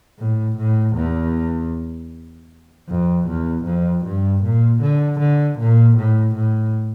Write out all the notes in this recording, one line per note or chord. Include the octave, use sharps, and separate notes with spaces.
A2
A2
E2
F2
E2
F2
G2
A#2
D3
D3
A#2
A2
A2